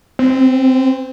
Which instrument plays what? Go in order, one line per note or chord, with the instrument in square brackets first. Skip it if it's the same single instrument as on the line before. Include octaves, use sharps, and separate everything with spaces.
[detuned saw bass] C4